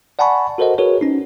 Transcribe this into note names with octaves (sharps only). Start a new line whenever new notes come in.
D5 F#5 G#5 A5 B5 C#6
F#4 A4 A#4 C5 D#5 F#5
F#4 G#4 A#4 B4 C#5
C#4 D#4